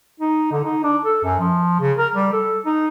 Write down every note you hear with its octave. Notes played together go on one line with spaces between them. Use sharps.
D#4
D3
D#4
D4
A4
F#2
F3
C#3
A#4
G3
A4
D#4